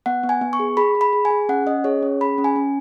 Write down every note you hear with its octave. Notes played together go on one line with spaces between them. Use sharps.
B3 F#5
B3
G#5
B3
C#6
G#4
G#4 B5
G#4
B5
G#4
G#5
G#4
C#4 F#5
C#4 D#5
G#4 C#5
C#4
G#4 B5
C#4
G#5
C#4